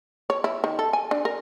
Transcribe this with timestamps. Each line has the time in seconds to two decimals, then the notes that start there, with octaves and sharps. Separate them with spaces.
0.30 C#5
0.44 E4
0.64 D#3
0.79 A4
0.93 G#5
1.11 D4
1.25 A#4